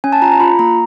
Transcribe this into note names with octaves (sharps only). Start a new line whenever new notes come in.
C#4 G#5
A5
F4 A#5
A#5
F4 B5
A#3 A#5